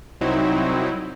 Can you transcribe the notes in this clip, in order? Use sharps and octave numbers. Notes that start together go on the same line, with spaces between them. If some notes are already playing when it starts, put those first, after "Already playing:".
C2 F#3 C4 D#4 E4